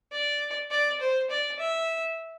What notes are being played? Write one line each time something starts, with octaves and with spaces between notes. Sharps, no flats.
D5
D5
C5
D5
E5